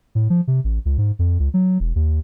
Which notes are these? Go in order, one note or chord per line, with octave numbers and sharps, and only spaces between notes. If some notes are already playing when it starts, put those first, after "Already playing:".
A2
F3
C3
A1
C#2
G#2
F2
C#2
F#3
E1
D#2